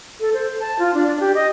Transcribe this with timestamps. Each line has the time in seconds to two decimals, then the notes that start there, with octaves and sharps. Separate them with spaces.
0.21 A4
0.34 C5
0.60 A5
0.79 F4
0.94 D4
1.07 D4
1.20 G4
1.35 D#5